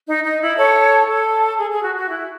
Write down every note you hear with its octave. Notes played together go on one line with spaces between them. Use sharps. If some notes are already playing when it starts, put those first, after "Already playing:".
D#4
D#4
E4
A4 C#5
A4
G#4
G#4
F#4
F#4
E4